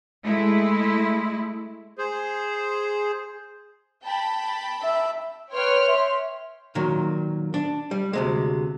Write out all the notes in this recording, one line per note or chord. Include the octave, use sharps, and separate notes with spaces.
G#3 A3 E4
G#4 C5
G5 A5 B5
E5
B4 C#5 G5 C6 F6
E5 C6
A#2 D#3 F#3
D4
G3
D2 C3 G#3